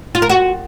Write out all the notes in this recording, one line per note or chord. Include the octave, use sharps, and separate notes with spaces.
F4
A#4
F#4